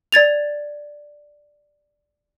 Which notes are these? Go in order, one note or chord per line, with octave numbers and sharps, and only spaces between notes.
D5 G#6 A6 F7